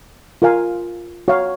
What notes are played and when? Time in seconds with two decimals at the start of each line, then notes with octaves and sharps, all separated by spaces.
0.42 F4 A#4 F5 G#5
1.28 F#4 C#5 F5